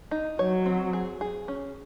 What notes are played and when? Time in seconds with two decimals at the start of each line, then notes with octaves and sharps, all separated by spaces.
0.11 D#4
0.39 F#3 C#5
0.66 C4
0.93 G#4
1.21 G#4
1.48 C#4